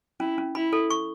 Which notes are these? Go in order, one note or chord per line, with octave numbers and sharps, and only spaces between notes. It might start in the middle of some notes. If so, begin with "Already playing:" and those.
C#4 E4
C#4
E4 B5
A4
C#6